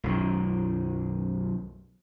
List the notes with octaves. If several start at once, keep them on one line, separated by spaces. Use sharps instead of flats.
B1 F#2 D#3